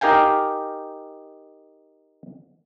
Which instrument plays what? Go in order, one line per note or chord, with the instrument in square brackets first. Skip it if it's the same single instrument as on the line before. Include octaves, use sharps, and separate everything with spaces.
[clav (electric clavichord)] D#4 G4 A#4 F5 G5 G#5